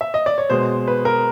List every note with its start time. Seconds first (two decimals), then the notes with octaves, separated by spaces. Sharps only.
0.01 E5
0.14 D#5
0.26 D5
0.38 C#5
0.50 B2 G#3 C5
0.87 B4
1.05 A#4